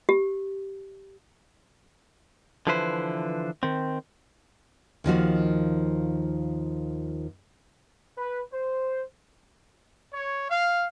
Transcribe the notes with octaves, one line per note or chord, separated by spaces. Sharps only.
G4
D3 E3 F3 E4 B4 C5
D#3 C4
D#2 D#3 F3 F#4
B4
C5
C#5
F5